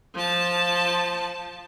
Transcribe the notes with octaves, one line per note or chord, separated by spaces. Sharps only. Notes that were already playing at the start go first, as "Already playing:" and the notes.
F3 A5